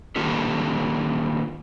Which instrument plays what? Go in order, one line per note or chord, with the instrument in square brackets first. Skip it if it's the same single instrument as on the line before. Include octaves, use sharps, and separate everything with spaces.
[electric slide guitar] D#3 A#3 D4 F4 G4 A4